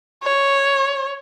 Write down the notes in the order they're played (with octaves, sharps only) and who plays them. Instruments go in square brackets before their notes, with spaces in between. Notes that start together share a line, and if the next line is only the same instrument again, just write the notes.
[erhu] C#5